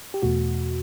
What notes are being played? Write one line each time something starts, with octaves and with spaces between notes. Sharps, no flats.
G4
E2 B2 A3 F#4